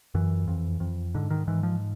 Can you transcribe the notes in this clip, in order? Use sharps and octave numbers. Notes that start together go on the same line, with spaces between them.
F#2 E3
F2
F2
G#2 D3
D#3
G#2 E3
F3